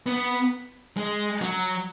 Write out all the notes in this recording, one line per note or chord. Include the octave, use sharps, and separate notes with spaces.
B3
G#3
F#3